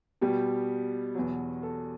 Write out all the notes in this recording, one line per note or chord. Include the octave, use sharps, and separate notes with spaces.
B2 G3 G4
E2 B2 F#3
A4